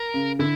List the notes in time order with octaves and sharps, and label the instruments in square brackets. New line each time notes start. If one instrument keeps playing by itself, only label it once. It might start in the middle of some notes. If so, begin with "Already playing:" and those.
Already playing: [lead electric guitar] A#4
[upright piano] C#3
[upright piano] D3 [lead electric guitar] E4